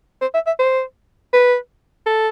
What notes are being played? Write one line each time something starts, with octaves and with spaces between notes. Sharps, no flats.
C5
E5
E5
C5
B4
A4